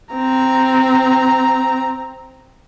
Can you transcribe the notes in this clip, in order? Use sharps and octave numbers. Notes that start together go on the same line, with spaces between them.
C4 A#5